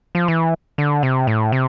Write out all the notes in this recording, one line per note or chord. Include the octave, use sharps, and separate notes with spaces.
F3
E3
D3
C3
A2
C3